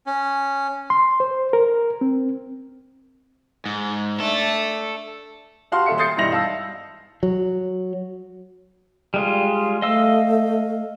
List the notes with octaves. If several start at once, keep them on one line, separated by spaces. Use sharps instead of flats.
C#4
C6
C5
A#4
C4
G#2
A3 D4 A4
F#4 G4 F5 A5 C6 F6
D#1 A4 E5 C#7
C6 D#6 G6 A6 C7 C#7
E1 G2 D#4 E4 A#6 F7
E5 F5 A5 E6
F#3
G3 G#3 F4
A3 D#5 F5 E6